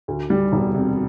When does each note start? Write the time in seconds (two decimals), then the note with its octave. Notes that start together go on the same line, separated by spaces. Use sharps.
0.08 D2
0.30 G3
0.52 E1
0.74 C3